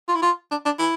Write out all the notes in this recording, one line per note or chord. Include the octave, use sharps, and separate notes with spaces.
F4
E4
F4
D4
D4
E4